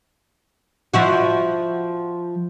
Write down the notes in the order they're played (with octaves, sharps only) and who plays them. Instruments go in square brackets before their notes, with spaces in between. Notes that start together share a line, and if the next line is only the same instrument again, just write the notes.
[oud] F3 E4 F#4